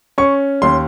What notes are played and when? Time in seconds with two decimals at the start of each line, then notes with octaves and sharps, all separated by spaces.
0.18 C#4 C#6
0.62 D#2 C6